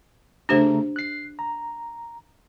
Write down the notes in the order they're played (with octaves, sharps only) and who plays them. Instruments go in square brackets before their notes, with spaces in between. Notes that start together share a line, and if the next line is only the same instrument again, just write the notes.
[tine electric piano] C#3 A3 A#5 [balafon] D4 G4 C5
[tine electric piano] F#6 C7
A#5